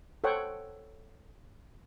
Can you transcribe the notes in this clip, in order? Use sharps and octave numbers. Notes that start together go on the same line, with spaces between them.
A4 C5 C#5 F#5 G5